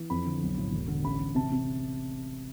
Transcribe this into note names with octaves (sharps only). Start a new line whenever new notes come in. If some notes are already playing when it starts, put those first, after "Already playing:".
Already playing: E3
F2 B5
D3
B1
A2
E1
D3
A1 B5
A1
C3 A5
C3